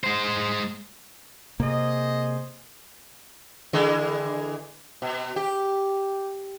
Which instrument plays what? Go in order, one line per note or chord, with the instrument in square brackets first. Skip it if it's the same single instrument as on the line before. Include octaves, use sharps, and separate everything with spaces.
[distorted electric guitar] G#3 C5
[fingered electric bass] C3 A#3 [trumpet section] G#4 C5 D#5
[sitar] D3 E3 G#3
B2
G4